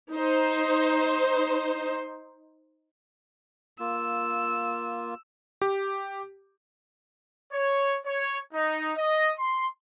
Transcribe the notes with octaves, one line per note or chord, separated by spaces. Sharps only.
D#4 C5
A#3 F4 E6
G4
C#5
C#5
D#4
D#5
C6